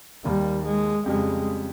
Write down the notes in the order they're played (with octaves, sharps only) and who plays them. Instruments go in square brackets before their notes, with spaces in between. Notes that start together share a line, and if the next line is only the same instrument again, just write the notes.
[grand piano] D#2 D#3 A#3 [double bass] G3
[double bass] G#3
[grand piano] F2 C#3 G3 [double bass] G#3